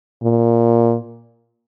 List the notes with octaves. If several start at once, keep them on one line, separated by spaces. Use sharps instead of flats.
A#2